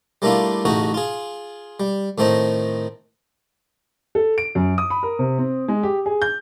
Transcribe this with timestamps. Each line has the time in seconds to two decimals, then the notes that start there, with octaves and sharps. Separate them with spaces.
0.22 G3 A3 A#3 D4 E4 F4
0.65 A1 C#3 A3 D#4 F#4
0.94 F4 G#4
1.80 G3
2.18 A2 D#3 A3 C4 D#4
4.15 A4
4.38 D7
4.55 F#2
4.78 D#6
4.90 B5
5.03 A#4
5.19 C3
5.38 C4
5.68 G#3
5.83 G4
6.06 G#4
6.22 G6